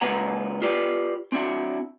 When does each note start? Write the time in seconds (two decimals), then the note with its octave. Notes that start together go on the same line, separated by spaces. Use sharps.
0.01 C#2 A#2 A#3 B4 F#5 A#5
0.62 F4 G4 B4 D5
1.32 C4 D4 E4 F#4